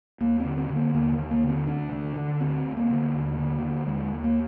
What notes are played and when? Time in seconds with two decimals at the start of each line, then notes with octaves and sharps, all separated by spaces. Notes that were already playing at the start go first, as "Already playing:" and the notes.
0.20 D#2 A#3
0.40 C4
0.45 D3
0.57 C4
0.69 D3
0.76 A#3
0.94 D#2 A#3
1.12 D#3
1.18 D#2
1.31 A#3
1.44 D3
1.49 C4
1.67 D2 D4
1.92 D3
2.16 D3
2.40 D2 C4
2.66 D2
2.77 A#3
2.90 D3
3.14 D#2
3.38 D3
3.62 D3
3.87 D#2 G#3
4.12 D#2
4.24 A#3